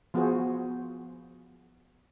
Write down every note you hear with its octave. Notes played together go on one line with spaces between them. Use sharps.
F3 B3 F4 F#4 G#4 C5